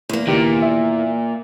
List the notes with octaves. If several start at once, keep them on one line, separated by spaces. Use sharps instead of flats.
E2 A#3
C#2 A#2 D#3 G4
E5